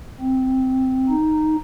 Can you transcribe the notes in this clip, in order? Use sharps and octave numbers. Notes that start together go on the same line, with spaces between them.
C4
D#4